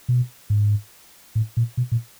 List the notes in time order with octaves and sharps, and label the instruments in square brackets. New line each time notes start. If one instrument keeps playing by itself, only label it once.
[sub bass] B2
G#2
A2
A#2
B2
A#2